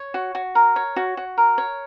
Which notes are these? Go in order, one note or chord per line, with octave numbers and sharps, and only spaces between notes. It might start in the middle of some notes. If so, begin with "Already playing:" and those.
Already playing: C#5
F#4
F#4
A#4
C#5
F#4
F#4
A#4
C#5